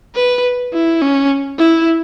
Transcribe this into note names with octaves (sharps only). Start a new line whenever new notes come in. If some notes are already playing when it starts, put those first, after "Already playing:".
B4
E4
C#4
E4